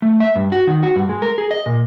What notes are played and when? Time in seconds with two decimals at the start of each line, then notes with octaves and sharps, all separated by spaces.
0.02 A3
0.20 E5
0.36 G2
0.52 F#4
0.67 D#3
0.83 F#4
0.96 G2
1.09 G#3
1.22 A#4
1.38 G#4
1.51 D#5
1.66 A#2